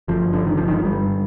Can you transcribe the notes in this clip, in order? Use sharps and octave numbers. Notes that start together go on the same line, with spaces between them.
G1 F3
D3
D#3
G1 F3
D#3
G2 G3